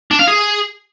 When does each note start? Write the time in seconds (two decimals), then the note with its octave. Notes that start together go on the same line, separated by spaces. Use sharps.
0.11 D4
0.19 F5
0.27 G#4